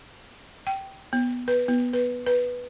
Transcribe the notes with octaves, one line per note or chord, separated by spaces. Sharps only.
G5
B3
B4
B3
B4
B4